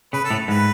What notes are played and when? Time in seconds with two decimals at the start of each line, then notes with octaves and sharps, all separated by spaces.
0.13 C#3 B4
0.24 A4
0.30 A2
0.48 G#2 B4